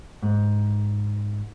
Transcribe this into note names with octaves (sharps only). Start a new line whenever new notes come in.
G#2